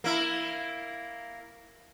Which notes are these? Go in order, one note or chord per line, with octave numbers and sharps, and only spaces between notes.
A#3 E4